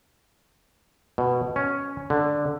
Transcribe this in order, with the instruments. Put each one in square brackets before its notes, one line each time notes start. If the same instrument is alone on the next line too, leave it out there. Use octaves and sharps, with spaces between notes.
[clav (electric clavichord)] B2
C#4
D3